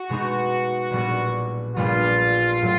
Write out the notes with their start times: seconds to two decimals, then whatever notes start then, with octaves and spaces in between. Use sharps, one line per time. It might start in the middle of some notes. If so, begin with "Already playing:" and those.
Already playing: F#4
0.09 B2 G#3 B3 D#4
0.90 A#1 A#2 G3 B3
1.76 A#1 A#2 G3 B3 F4
2.62 A2 F#3